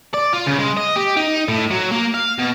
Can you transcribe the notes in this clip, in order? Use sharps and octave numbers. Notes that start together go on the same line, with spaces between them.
D5
F4
C#3
G#3
D#5
G4
D#4
A2
F#3
A#3
F5
B2